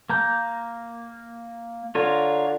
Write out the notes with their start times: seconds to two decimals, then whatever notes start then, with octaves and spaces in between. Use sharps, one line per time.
0.10 A#3 A#5 G6
1.95 D3 F4 A#4 C#5